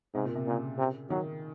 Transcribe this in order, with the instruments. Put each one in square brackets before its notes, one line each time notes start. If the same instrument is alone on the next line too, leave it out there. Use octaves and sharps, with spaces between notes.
[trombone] G#2 [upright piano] C3
[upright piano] A#2
C3
[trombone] A#2 [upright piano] C#3
[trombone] C3
[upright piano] D#3 [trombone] F#3